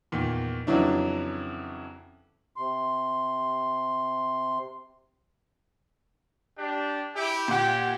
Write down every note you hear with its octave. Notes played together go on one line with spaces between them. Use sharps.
E2 A#2 D#3
F2 C#3 E3 F#3 D4 E4
C3 C6
D4 G4
E4 G4
A#2 G4 F#5